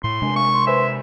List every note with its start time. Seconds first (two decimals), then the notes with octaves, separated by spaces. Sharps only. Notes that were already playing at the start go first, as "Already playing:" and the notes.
0.04 A2 C6
0.22 C3 G#3 D4 G#5
0.36 F5 C#6
0.53 C6
0.67 B4 C5 E5 G#5